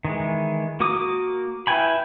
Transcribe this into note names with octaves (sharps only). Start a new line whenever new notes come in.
D#3 E3 G#3
A#3 F#4 A#4 D6 D#6
E4 B4 G5 G#5 B5